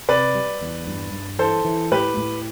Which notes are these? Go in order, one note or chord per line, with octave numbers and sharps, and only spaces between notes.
C3 B4 D5
G3
E2
G2
G2
E3 A4 C5
E3
A2 G4 B4
A2